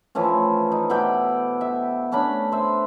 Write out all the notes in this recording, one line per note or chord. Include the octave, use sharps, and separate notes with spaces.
E3 F3 A3 C#4
D#4
B2 E4 D5 G5
E5
A3 C#4 D4 B5
C5 E5